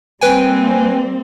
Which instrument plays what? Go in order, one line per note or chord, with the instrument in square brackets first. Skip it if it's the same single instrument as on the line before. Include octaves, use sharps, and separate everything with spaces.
[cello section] G3 A#3 C4 [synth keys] B4 G5 G#5